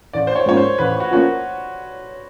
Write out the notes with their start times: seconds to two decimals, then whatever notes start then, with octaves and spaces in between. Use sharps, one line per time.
0.13 A1 D5
0.27 C5
0.36 C#5
0.46 G#2 F3 A#3 C#4 C#5
0.57 C5
0.79 A1 B4
1.00 F#4
1.11 F3 A#3 C#4 F#4